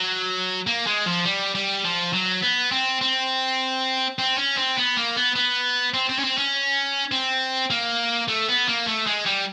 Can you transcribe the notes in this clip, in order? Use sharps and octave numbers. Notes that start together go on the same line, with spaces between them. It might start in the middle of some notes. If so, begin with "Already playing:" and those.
Already playing: F#3
A#3
G#3
F3
G3
G3
F3
F#3
B3
C4
C4
C4
C#4
C4
B3
A#3
B3
B3
C4
C4
C#4
C4
C#4
C4
A#3
A3
B3
A#3
A3
G#3
G3